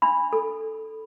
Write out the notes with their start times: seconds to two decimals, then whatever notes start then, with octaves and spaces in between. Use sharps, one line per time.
0.02 D4 B5
0.33 A4